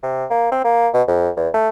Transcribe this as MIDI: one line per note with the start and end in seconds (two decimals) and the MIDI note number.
0.03 0.25 48
0.30 0.50 58
0.51 0.61 60
0.64 0.88 58
0.94 1.02 47
1.08 1.29 41
1.37 1.49 40
1.54 1.69 57